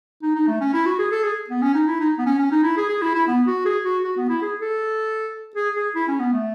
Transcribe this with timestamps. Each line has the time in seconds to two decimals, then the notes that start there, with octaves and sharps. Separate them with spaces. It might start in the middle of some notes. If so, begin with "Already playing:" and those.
0.22 D#4
0.35 D#4
0.47 A3
0.61 C#4
0.73 E4
0.86 F#4
0.99 G#4
1.11 A4
1.23 G#4
1.50 B3
1.62 C#4
1.74 D#4
1.87 E4
2.00 D#4
2.18 B3
2.26 C#4
2.39 C#4
2.51 D#4
2.63 E4
2.77 G#4
2.89 G#4
3.01 E4
3.15 E4
3.27 B3
3.47 F#4
3.65 G#4
3.84 F#4
4.03 F#4
4.17 B3
4.29 E4
4.42 G#4
4.61 A4
5.56 G#4
5.75 G#4
5.95 E4
6.08 C#4
6.19 B3
6.33 A3